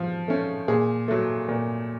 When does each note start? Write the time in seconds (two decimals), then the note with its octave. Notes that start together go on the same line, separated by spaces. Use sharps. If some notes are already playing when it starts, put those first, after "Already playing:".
Already playing: F3
0.28 A3 C#4
0.68 A#2 G#4
1.08 F#3 A3
1.49 A#2